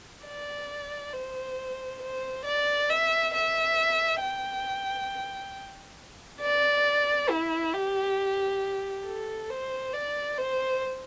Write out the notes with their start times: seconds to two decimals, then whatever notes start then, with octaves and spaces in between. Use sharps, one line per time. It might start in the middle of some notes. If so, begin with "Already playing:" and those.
0.24 D5
1.13 C5
2.02 C5
2.45 D5
2.90 E5
3.33 E5
4.21 G5
6.41 D5
7.29 E4
7.74 G4
9.06 A4
9.50 C5
9.93 D5
10.37 C5